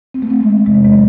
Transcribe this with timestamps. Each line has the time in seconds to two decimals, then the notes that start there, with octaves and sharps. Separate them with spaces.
0.14 C4
0.22 A3
0.30 C4
0.40 G#3
0.66 E2 C3 E3 G#3
0.84 G#3
0.93 F#3